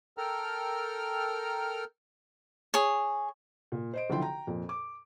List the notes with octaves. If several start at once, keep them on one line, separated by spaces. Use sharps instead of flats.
A4 A#4 G5 A#5 F6
G#4 C#5
A#2
C5 D#5 D7
B1 D3 F3 E4 G5 C6
G5 A#5
F2 A#2
D6